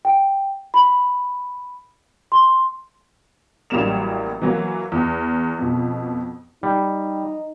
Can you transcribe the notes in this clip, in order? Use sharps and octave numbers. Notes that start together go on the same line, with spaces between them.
G5
B5
C6
A1 F#3 G3 A#3 E7 F7
E3 F#3 A#3
E2
F2 B2
G3 D#4